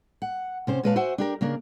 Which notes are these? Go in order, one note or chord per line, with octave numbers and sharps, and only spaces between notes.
F#5
C3 C#4 C5
A#2 G#3 B4 C#5 F5 A5
F#4 C5 E5 F#5 G#5
D4 G4 A#4
C#3 A#3 D4 A#4